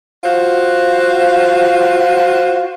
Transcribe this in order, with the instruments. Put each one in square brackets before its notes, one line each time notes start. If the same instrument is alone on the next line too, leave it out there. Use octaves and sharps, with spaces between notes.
[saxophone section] F4 F#4 C5 F5